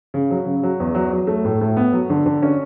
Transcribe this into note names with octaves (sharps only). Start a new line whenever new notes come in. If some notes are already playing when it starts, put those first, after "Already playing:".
C#3
F#3
C#3
F#3
E2
F#3
F#3
A3
A2
A2
B3
F#3
D3
D3
C#4